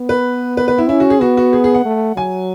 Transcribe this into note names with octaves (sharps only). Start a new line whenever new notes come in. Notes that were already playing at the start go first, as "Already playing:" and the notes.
Already playing: B3
B4
B4
B4
E4
C#4 E4
F#4
G#4
B3 F#4
F#4
G#4
G#4
F#5
A3
F#3 G#5